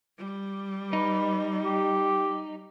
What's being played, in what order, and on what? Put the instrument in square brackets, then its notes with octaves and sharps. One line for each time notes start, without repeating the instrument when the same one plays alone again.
[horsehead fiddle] G3
[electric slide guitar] D#4 [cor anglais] B4
[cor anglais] G4